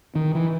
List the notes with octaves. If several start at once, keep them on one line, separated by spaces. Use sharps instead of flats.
D#3
E3